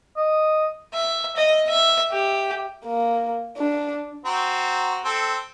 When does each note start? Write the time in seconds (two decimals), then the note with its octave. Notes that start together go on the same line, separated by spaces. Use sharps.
0.17 D#5
0.94 E5
1.36 D#5
1.69 E5
2.12 G4
2.85 A#3
3.58 D4
4.25 C4 F#4 A#5
5.05 C4 A4